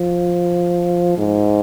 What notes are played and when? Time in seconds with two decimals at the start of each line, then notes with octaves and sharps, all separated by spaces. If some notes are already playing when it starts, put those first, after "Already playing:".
Already playing: F3
1.18 G#2